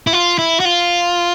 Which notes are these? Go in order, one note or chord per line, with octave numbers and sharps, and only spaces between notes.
E4
F4
E4
F#4
F4